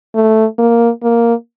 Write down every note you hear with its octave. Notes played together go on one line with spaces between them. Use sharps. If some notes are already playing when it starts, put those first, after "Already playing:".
A3
A#3
A#3